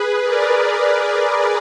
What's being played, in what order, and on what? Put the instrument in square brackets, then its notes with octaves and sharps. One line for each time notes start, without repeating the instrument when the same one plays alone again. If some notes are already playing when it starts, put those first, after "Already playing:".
Already playing: [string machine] G#4 B4
A#4 D5